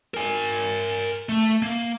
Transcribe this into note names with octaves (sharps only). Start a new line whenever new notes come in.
A#4 G#5
A3
A#3